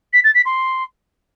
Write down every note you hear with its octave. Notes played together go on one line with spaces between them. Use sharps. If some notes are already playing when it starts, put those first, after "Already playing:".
B6
A6
B6
C6